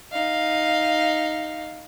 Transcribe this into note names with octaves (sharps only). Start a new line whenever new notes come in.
D#4 F5